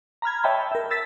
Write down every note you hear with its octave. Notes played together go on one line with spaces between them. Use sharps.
A#5 B5 F6 G#6
C#5 D#5 E5 G5 A5 B5
A#4 E5
E6 A6 B6